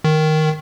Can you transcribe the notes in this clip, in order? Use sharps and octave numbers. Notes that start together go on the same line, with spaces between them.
D#3